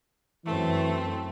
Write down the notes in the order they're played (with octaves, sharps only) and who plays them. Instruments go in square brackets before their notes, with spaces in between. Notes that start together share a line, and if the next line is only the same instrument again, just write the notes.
[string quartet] F#2 A3 C4 [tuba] E3